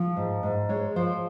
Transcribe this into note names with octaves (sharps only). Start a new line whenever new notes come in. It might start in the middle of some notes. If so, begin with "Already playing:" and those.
Already playing: F3
G#2
G#2
G#3 C#5
F3 C5